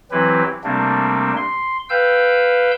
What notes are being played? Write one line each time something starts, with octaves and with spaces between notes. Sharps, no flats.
E3 F#3 C4 E4 G4 B4
C3 G3 A3 A#3 C4 D4
C6
B4 F5 G5 E6 G6